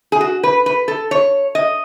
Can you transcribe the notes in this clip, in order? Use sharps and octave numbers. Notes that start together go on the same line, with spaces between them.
G#4
F#4
B4
B4
A4
C#5
D#5